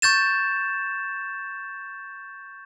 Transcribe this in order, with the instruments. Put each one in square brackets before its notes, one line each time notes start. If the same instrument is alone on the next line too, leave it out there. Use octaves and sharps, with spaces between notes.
[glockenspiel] C#6 G6 A6 E7